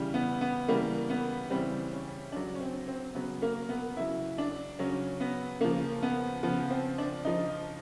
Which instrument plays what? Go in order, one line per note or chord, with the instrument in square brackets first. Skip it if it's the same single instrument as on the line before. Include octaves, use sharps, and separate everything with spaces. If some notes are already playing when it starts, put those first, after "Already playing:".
Already playing: [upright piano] C#3 E3 G3
B3
B3
C#3 E3 G3 A#3
B3
C#3 E3 G3 C4
C#4
C#3 F#3 D4
C#4
C4
C4
C#3 F#3 B3
A#3
B3
C#3 F#3 E4
D4
C#3 F#3 C#4
B3
C#3 F3 A#3
B3
C#3 F3 B3
C4
D4
C#3 F3 D#4